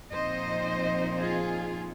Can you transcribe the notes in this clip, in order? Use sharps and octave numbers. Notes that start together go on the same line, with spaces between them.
A#2 F3 C4 D#4 C5 D#5
F4 G#4